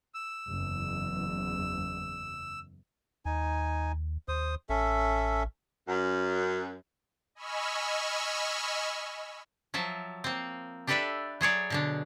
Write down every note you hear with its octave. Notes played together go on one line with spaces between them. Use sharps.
E6
F#1 E2
D#2 D#4 G#5
D#2 C5 D#6
A1 C#4 A4 E5
F#2
D#5 G#5 B5 C#6 E6 F6
F3 F#3 E5 A5
A#3 C4
D4 G4 A4 B4 D5 E5
F#3 G#4 C#5 D5
B2 D3 D4